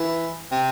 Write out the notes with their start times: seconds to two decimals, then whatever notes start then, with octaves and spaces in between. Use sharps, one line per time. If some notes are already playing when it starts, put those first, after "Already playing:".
Already playing: E3
0.52 C3